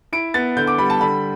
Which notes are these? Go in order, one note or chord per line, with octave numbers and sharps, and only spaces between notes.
E4 D7
B3 A6
D3 G6
D6
G3 B5
A5
D3 B5